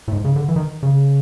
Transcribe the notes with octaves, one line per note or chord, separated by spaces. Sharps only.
A2
G#2
C#3
D3
E3
D#3
C#3